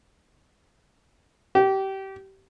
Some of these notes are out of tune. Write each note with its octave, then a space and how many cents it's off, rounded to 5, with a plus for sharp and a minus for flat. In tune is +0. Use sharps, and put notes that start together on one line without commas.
G4 -25